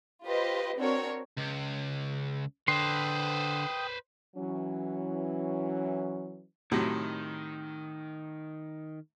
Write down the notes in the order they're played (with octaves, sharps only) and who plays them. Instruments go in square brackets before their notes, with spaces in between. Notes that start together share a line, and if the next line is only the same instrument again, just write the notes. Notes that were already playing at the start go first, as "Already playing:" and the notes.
[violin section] F4 G4 B4 C5 D#5
C4 D4 F#4 A#4 C#5
[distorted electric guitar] C#2
[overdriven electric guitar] D3 [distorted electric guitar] B4 C5 [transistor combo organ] G5 D#6 [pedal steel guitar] C6
[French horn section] E3 F#3 C#4
[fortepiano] A2 C3 F#3 [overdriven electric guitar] D#3